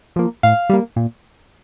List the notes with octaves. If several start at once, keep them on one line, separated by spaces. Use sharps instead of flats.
F3 A#3
A2 F5
G3 A#3
A#2